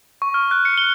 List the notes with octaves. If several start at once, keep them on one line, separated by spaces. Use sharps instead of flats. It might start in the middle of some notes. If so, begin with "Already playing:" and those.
C#6
F6
F#6
C#7
G7